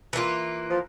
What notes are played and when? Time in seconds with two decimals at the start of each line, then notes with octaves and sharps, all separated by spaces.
0.13 E3 A#3 F4
0.70 F3